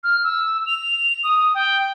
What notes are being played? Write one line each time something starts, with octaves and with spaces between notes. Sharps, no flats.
F6
E6
F7
D#6
G5